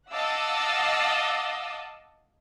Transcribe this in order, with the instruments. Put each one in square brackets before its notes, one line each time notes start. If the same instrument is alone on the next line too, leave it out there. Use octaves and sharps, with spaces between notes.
[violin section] D#5 F5 F#5 A5 D6 E6